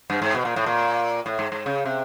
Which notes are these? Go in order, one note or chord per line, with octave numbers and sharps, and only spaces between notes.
G2
G#2
B2
A#2
A2
A#2
A2
G#2
G#2
C#3
C3